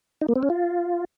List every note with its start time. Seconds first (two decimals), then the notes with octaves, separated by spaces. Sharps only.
0.21 D#4
0.29 A#3
0.36 C4
0.43 C#4
0.50 F4